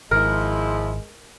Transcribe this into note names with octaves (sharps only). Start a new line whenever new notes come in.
G#1 F3 G#3 E4 A#4